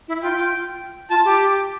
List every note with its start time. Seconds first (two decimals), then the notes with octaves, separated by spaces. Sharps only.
0.08 E4
0.22 F4 G5
0.37 F4
1.10 F4 A5
1.24 G4